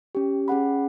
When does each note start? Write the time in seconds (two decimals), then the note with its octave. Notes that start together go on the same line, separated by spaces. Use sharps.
0.15 C#4 G4
0.48 C#4 G#4 F#5 B5